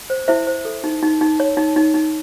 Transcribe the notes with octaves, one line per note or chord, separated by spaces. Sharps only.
C5
E4 C5 E5
C5
A4
D#4
D#4
D#4
C#5
D#4
D#4
D#4